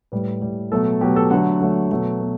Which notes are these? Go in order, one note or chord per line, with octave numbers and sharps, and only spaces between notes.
A2 G3 B4
A2 G3
B2 F#3 A3 A4
B2 F#3 A3 G4
A4
D3 F#3 A3 F#5
D3 F#3 A3
B2 F#3 A3
B2